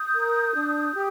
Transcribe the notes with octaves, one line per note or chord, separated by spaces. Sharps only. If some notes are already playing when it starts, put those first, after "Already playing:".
Already playing: D#6 G6
A#4
D4
G4